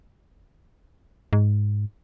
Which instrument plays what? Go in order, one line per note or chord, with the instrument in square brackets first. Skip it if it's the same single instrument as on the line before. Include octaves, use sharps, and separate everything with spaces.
[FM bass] G#2